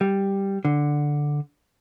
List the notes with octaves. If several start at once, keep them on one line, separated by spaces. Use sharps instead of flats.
G3
D3